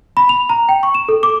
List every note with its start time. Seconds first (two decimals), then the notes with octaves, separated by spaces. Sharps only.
0.17 B5
0.29 F7
0.49 A#5
0.69 G5
0.83 C#6
0.95 E7
1.09 A4
1.23 D6